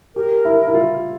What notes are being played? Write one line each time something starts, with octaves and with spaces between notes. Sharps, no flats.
G4 A#4
E4
E4
F4